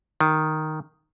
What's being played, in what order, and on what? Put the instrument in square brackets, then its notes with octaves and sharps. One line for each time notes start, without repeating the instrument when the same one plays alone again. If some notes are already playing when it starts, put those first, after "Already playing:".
[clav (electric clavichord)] D#3